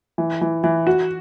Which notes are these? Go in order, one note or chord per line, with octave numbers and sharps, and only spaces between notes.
E3
E3
E3
F#4